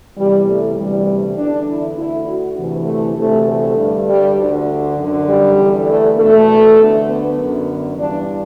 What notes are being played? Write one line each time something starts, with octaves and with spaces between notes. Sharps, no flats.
E2 C3 E3 G3
A3
D2 C3 E3 G3
E2 D3 D4
E4
D2 D3 E4
F#4
D2 C3 E3
A3
D2 C3 E3 A3
A3
G2 D3
G3
D2 D3
F#2 D3
G3
E2
D3
A3
E2 B2 A3
D2 D3
B3
F#2 D3
G2 E3 D4